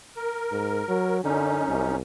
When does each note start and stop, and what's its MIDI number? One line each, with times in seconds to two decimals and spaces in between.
0.16 1.17 70
0.52 0.83 44
0.88 1.19 54
1.24 1.96 42
1.24 1.63 50
1.24 1.96 61
1.24 1.96 63
1.69 2.02 36